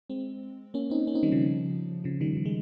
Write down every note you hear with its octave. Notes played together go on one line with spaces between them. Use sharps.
G#3 C4
A#3 C#4
C4 D#4
A#3 C#4
C4 D#4
D#3 G3
C#3 F3
C#3 F3
D#3 G3
F3
D#3
G#3